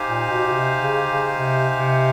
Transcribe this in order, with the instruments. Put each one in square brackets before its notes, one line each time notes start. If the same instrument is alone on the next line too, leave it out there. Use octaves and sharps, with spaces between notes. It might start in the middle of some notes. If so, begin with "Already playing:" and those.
Already playing: [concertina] D#4 G4 C5 F5 G#5
[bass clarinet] A#2
B2
B2
C3
C#3
C#3
C3
C3